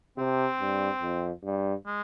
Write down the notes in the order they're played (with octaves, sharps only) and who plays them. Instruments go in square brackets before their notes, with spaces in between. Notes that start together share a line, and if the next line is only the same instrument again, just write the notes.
[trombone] C3 [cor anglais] C4
[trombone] G2
F2
G2
[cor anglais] G#3